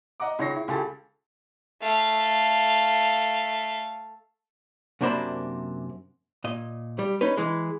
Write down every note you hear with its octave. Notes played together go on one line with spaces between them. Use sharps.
D#5 F#5 A#5 D6
C#2 D#3 C#5 C#6 A#6 C7
E4
C#2 G4 A4 G#5 A6
A3 F5
F#2 C3 A#3 D4 C5 B5
A#2 D#5
G3
C#4 D#4 B4
E3 G#3